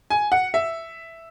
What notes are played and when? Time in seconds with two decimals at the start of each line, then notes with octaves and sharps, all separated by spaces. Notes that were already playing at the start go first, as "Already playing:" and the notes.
0.10 G#5
0.32 F#5
0.54 E5